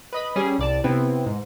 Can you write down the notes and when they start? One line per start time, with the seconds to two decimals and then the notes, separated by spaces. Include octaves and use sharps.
0.13 B4 D#5 B5
0.36 G3 C#4 G4 G#4
0.58 C2 D5 A5
0.84 C3 B3 C4 E4
1.26 G#2